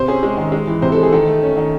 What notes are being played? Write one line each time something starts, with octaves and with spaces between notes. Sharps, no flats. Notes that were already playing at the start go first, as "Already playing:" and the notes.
Already playing: C3 C5
C#4 G#4
G#3
D#3
G#3
E3
C3 C5
A4
G#3
G#4
D#3 A4
A3
C#4
D#3